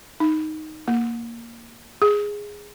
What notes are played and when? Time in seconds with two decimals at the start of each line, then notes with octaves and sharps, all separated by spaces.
0.20 D#4
0.88 A#3
2.02 G#4